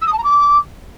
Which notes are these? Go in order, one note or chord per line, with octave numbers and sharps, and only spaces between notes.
E6
D#6
A5
A#5
D6